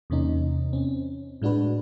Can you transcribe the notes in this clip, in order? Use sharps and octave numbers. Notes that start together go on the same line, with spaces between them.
E2 C3 A#3 C#4 D#4
C4 C#4
A2 G#3 D4 F#4 B4